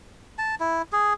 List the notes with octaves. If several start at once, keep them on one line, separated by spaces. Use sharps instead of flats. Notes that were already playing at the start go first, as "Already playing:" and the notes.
A5
E4
G#4